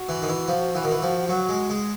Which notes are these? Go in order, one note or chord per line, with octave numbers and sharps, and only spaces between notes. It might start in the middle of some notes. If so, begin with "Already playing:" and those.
Already playing: F#4
E3
D#3
E3
F3
E3
D#3
E3
F3
F#3 F#4
G#3
G#3